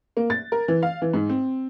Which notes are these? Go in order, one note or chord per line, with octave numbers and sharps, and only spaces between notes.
A#3
A6
A#4
E3
F5
E3
G#2
C4